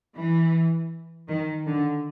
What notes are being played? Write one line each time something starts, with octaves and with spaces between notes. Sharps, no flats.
E3
D#3
D3